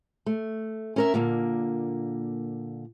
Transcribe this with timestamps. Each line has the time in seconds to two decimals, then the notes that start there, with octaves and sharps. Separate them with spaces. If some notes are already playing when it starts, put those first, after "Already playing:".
0.26 A3
0.96 C#4 A#4 E5
1.14 A#2 D3 A#3